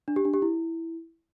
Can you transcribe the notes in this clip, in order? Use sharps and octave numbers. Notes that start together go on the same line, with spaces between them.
D4
G4
D4
G4
E4